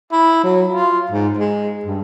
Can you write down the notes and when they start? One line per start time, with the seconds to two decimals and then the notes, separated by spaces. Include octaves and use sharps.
0.12 E4
0.44 F#3
0.71 F4
1.11 G#2
1.39 G#3
1.85 G2